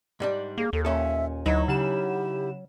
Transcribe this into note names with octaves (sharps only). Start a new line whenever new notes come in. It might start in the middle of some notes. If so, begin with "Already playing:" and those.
G#2 G3 D4
A#3 G#4
D#2 A4
A#2 C#4 A4 E5
D2 F#3 D#4 E4 D#5
C#3 G4 F#5 E7